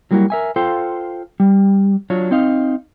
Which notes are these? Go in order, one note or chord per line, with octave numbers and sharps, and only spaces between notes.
F#3 G3 A#3 E4 F#4
A#4 E5 G#5
F4 A4 C5 F5 G5
G3
F#3 D4 F4 C#5
C4 D#4 D#5 F5